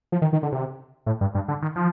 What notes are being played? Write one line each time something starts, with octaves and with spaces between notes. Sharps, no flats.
F3
D#3
D#3
D3
C3
A2
G2
G2
D3
D#3
F3